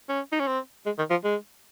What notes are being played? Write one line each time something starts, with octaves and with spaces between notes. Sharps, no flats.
C#4
D#4
C#4
C4
G#3
D#3
F3
G#3